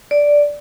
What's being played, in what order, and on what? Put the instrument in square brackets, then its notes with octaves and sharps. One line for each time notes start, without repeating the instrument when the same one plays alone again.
[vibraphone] D5